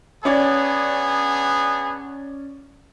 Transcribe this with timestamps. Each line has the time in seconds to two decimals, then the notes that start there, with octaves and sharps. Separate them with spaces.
0.25 B3 C#4 D4 G#4 C#5 D5